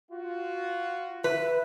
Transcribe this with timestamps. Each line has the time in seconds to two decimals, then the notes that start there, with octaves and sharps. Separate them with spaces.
0.11 F4 F#4
1.24 B4 E5